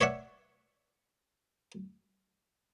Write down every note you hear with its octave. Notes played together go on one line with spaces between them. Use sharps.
C#5 D5 E5 F#5